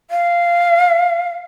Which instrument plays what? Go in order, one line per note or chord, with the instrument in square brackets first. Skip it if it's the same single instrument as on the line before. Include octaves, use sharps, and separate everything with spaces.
[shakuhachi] F5